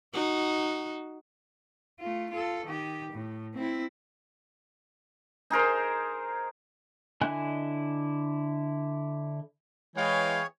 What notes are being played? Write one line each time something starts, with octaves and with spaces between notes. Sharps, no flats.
D#4 F#4
A3 F4
F4 A4
D#3 G4
A2
C4 E4
D#4 G#4 A#4 C5
D3 E4 D#5 G#5 F#6
E3 G#3 G#4 C#5 F5 G5